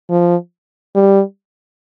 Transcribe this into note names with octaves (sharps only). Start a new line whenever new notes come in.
F3
G3